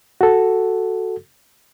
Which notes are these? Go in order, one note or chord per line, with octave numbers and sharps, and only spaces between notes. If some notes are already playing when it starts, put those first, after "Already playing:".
F#4 A4